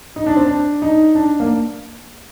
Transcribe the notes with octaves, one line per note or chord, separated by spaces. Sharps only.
D#4
D4
C4
D4
D#4
D4
A#3